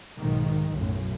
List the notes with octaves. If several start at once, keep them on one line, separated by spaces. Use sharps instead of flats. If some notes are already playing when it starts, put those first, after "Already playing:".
B1 G#2 D#3
B1 F#2 A2